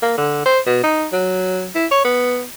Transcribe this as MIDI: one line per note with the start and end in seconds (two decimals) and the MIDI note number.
0.02 0.15 58
0.18 0.44 50
0.46 0.60 72
0.66 0.82 47
0.83 1.06 63
1.13 1.69 54
1.75 1.86 64
1.92 2.00 73
2.05 2.44 59